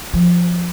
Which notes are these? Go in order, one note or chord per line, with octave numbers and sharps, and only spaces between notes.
F3